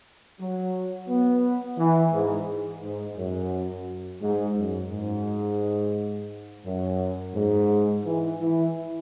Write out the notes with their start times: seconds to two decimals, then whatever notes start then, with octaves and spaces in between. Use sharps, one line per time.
0.40 F#3
1.08 B3
1.78 E3
2.13 G#2
2.82 G#2
3.17 F#2
4.22 G#2
4.57 F#2
4.91 G#2
6.65 F#2
7.35 G#2
8.05 E3
8.39 E3